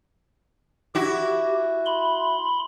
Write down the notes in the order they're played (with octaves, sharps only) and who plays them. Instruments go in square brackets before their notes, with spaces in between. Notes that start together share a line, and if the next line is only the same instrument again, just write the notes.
[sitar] E4 F#4 [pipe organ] G4
[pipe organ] B5 C6